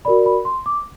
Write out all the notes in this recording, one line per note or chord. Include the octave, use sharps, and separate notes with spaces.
F#4 A#4 D5 B5
B5
C6
D6